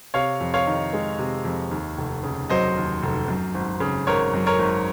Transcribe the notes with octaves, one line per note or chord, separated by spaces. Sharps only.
C3 C#5 F5
F2
C#5 F5
D#3
G#3
C3
F2
D#2
F1
C#3
F#3 C5 D#5
D#2
F1
F#2
G#1
C#3
G#1 A#4 C#5
F#2
A#4 C#5
G#1